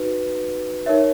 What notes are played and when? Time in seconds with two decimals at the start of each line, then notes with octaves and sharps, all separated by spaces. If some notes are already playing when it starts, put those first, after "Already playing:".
Already playing: D#4 F#4 B4
0.86 D#4 A#4 C#5 E5